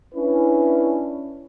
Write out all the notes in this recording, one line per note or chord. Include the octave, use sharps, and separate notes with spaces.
C#4 D4 E4 B4